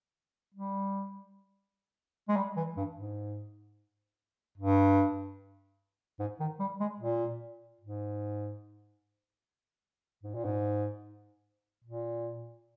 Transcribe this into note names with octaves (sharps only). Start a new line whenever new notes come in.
G3
G#3
G3
E3
G2
G#2
G2
G#2
D#3
G3
G#3
A#2
G#2
G#2
A#2
G#2
A#2